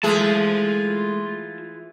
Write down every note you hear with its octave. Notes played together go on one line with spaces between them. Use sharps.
E3 G#3 A3 F4 G#4 A5